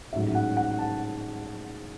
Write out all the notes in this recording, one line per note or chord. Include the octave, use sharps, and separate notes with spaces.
A1 G#2 F#3 E5
F#5
F#5
A5